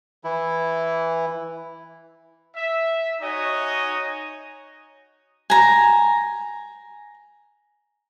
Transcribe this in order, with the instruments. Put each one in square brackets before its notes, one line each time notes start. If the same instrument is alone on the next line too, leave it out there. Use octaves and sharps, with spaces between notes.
[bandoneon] E3 E4
[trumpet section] E5
D#4 F#4 C#5 D#5 G#5
[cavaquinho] G#5 A#5